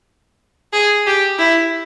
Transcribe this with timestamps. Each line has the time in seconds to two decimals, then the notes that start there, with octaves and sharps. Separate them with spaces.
0.73 G#4
1.06 G4
1.39 E4